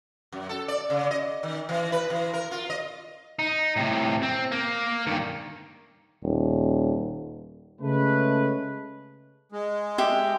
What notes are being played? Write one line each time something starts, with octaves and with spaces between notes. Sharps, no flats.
F#2
A4
D5
C#3
D#5
D#3
E3
B4
E3
A#4
F4
D#5
D#4
A2 C3
C4
A#3
G2 D#3
D#1
C#3 G#3 A3 B4
G#3
G4 E5